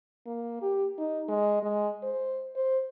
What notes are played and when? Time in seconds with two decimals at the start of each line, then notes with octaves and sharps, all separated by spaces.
0.27 A#3
0.62 G4
0.98 D#4
1.29 G#3
1.63 G#3
2.03 C5
2.56 C5